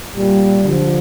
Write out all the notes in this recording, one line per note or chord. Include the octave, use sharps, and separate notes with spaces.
A#2 G3
D3 F3